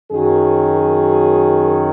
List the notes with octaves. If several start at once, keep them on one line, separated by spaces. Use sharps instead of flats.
F#2 D#3 F#3 G#4